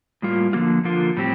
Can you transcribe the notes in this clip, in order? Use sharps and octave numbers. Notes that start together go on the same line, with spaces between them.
A2 G3 A#3 F4
D3 F3 A#3 F4
D3 F3 A#3 F4
A2 G3 C4 G4